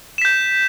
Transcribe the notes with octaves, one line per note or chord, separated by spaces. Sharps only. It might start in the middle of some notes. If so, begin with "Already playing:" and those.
G6 B6 E7